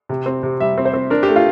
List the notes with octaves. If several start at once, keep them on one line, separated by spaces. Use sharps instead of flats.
C3
C4
C3
G3 E5
C4
C5
C4
D4 A#4
G4
A3
F4